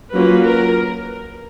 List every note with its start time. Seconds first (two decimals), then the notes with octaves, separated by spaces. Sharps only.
0.12 F#3 A#3 C#4 F4 B4
0.44 A#4